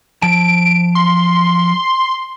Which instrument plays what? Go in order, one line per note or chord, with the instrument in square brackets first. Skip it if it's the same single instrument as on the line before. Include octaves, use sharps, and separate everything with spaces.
[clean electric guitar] F3 A5 [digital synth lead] D7
[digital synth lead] C6